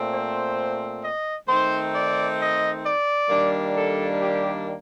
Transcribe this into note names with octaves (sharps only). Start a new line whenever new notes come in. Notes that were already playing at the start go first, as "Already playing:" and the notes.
Already playing: A#2 A3 C4
C5
D#5
D#3 A3 C4 D#4 C5
D5
D#5
D5
D#3 G3 A#3 D4
A4
G4